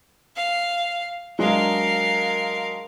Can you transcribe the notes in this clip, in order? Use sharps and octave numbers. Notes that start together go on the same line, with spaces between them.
F5
F#3 G#3 D4 A#4 F5